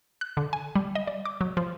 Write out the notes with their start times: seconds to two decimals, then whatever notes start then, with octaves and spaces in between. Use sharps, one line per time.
0.21 F#6
0.37 D3
0.53 G#5
0.76 G3
0.95 D#5
1.07 D5
1.25 D6
1.41 F#3
1.57 F3